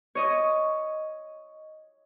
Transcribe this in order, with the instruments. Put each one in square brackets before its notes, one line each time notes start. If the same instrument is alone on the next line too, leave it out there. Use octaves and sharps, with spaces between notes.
[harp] C#5 D#5 D#6